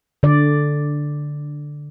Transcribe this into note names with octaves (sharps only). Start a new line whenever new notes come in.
D3 D5